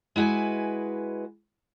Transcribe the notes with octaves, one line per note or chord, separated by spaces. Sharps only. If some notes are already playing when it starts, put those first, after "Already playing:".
G#3 E4 F#4 B4 G#5